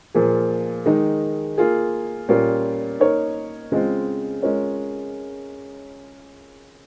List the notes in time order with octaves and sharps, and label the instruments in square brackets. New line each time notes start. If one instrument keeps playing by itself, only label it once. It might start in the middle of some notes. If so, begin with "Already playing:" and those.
[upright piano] A#2 F3 A#3 F4 G#4
D#3 G#3 D#4
A#3 F4 G#4
A#2 G3 C#4 F4 A#4
A#3 D#4 A#4 C#5
C#3 G#3 C4 F4
G#3 C#4 F4 A#4 C#5